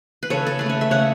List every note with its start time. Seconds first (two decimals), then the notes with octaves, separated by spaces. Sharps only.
0.23 B4
0.30 C#3 A4 C#5
0.47 A4
0.59 A3 B4
0.66 C#4 C#5
0.81 E5
0.91 C#3 C#5 F#5